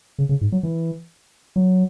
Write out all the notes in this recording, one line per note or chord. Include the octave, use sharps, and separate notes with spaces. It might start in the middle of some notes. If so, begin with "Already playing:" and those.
C#3
C#3
G#2
F#3
E3
F#3